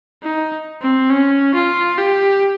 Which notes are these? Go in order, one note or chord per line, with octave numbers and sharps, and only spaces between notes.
D#4
C4
C#4
F4
G4